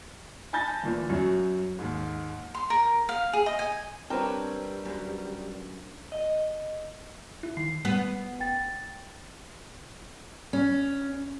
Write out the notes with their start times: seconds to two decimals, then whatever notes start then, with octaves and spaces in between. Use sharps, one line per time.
0.53 G#5 A5 B5 G6 A6 A#6
0.83 D2 A#2 E3
1.09 F#2 F#3
1.79 D#2 G#2
2.54 C6
2.70 A#4
3.09 F5
3.33 G#4
3.46 D#5
3.59 G#5
4.10 G3 C4 D4 A#4 B4 C#5 G5
4.85 F#2
6.12 D#5
7.43 E4
7.57 D#3 C7
7.85 G3 B3
8.40 F1 G5 A6
10.53 C#4